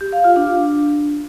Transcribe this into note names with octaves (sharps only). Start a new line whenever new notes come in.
G4
F5
F4
D4